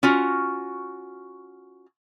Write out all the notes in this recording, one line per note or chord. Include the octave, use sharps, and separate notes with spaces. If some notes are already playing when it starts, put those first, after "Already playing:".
C#4 F4 F#4